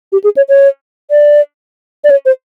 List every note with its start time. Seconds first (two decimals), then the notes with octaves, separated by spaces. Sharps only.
0.12 G4
0.24 G#4
0.37 C#5
0.49 C#5
1.11 D5
2.04 D5
2.10 C#5
2.26 C5